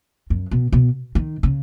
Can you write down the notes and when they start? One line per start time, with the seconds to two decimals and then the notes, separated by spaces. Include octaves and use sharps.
0.30 F#2
0.51 B2
0.72 B2
1.15 D#3
1.43 C#3